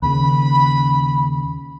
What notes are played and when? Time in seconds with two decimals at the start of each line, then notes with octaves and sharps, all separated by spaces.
0.02 D#2 C#3 B5